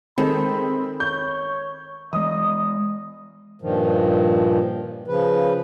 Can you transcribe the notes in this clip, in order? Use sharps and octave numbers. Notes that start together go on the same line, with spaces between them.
D#3 G#3 C4 A4 B5
C#5 G6
E3 G#3 D#5 D#6
G2 A#2 D#3 F3
C#3 F3 B4